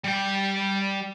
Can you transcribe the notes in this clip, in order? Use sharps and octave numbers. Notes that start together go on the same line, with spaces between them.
G3 G5